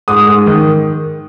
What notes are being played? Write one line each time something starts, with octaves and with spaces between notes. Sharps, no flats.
G#2 D#6
G#2
D#3